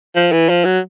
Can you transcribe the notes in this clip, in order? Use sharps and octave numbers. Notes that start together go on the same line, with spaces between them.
F3
E3
F3
F#3